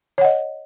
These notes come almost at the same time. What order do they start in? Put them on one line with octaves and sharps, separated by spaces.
C#5 F#5 D#5